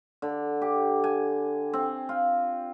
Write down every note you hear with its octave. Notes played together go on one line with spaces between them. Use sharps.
D3
G4
G#5
C4
F4